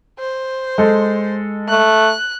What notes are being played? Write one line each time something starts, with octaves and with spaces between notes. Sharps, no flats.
C5
G#3 A4
A3 F#6